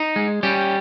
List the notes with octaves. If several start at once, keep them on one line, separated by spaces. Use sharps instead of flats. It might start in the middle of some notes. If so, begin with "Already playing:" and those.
Already playing: D#4
G#3
G3 C#4 G4